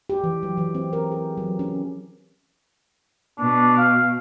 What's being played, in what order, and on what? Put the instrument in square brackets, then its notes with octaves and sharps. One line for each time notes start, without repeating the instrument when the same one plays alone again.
[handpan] G4
E3
F#3
E3
C4
A#4
G#4
F#3
C#4
[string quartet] B2 [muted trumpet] D4
[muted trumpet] F5